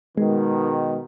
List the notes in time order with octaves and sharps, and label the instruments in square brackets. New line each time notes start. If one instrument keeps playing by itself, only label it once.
[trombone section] B2 D#3 [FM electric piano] G#3